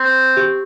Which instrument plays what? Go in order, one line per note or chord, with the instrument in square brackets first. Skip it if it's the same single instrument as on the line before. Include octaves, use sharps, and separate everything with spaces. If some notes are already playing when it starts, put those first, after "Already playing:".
Already playing: [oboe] C4
[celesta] G4